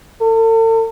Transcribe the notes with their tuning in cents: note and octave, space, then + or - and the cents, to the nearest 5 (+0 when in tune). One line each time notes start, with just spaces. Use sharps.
A4 +40